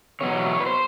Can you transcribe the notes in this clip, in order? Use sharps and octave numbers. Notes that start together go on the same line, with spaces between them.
E2 B2 F#3 C#5
B4
C5